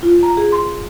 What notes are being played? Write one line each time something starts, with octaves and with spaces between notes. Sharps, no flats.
F4
A#5
G#4
C6